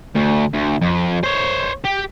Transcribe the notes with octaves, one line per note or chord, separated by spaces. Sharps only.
D2
D2
F2
C5 C#5
G4